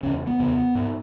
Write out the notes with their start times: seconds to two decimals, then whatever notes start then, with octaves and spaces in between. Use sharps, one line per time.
0.03 E2 C#3 C#4
0.27 B3
0.39 E2 C#3
0.75 G#2